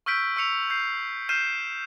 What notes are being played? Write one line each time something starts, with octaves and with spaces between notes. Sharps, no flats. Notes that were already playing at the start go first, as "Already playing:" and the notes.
C#6 E6 F6 G6 B6 D7
C#6 E6 C#7 F7
G6 C7
F6 G6 C7 D#7 E7